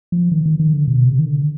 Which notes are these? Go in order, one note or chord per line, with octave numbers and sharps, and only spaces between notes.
F3
D#3
D#3
D#3
D3
B2
C3
D#3
D3